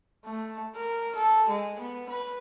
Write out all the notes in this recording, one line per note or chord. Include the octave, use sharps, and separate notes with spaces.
A3
A#4
A4
G#3
B3
B4